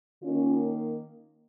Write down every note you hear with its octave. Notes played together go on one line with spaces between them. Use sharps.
D#3 A#3 C#4 F4